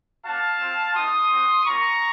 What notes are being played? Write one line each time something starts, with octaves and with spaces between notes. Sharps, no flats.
A#3 C#4 F#4 F5 A5
C4 F4
A3 C4 D#4 F#4 C6 D#6
C4 F#4
A#3 C#4 F4 A#5 C#6